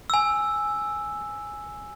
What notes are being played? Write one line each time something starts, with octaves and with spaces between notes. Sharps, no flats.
G#5 E6